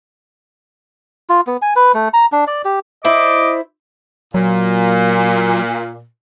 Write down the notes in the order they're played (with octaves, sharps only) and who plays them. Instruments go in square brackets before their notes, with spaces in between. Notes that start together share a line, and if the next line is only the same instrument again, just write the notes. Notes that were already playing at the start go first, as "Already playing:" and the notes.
[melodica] F4
B3
G#5
B4
A3
A#5
D4
D5
G4
[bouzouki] E4 C5 D5 [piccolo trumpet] D#5 [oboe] D6
[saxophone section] A#2 [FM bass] F#3